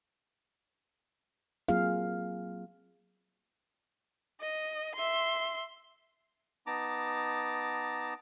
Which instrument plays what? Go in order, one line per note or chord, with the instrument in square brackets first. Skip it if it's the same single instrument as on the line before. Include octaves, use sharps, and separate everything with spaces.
[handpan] F#3 A#3 C4 F4 G#4 F5
[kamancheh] D#5
E5 C6
[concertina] B3 D#4 A5 A#5 D6